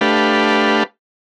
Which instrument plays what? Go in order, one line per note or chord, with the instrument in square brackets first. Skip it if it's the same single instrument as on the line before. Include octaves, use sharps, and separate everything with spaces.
[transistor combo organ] A3 D4 G4 B4 F5